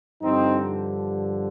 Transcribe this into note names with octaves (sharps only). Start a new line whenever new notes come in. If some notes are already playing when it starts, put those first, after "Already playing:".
G2 D3 F3 C4 D#4